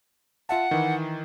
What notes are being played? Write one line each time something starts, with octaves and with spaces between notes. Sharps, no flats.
F4 E5 F#5 A5
D#3 E3